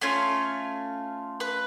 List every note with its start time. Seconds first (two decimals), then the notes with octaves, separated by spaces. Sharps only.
0.01 A3 C#4 F4 C#5
1.40 B4